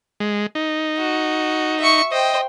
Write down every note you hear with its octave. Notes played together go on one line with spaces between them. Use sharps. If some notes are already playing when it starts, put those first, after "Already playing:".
G#3
D#4
F#4
E5 C#6
C5 D#5 G5